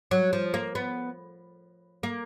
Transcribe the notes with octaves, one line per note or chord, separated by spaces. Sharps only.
F#3
F3
A#3
B3
A#3